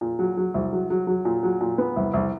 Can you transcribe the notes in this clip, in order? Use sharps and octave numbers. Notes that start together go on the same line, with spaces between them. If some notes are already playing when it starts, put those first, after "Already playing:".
A#2
F#3
F#3
C2
F#3
F#3
F#3
A#2
F#3
A#2
B3
C2
C2